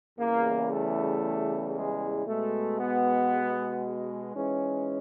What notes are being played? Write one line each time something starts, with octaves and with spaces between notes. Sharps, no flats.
E2 C#3 E3 G3 A#3
A3
G#3
B2 G#3 A3
B3
G#2 E3 G#3 C#4